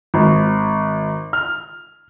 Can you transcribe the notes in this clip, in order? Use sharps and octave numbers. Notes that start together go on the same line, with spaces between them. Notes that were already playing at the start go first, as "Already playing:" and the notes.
G#1
F6